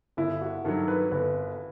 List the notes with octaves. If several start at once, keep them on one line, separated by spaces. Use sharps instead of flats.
G1 E4
F#4
G2 D#3 F#3 A4
B4
G1 B4